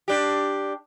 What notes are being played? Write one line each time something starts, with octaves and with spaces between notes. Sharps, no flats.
D4 G4